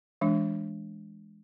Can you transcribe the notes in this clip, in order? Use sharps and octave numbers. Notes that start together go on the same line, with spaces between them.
E3 G#3 D4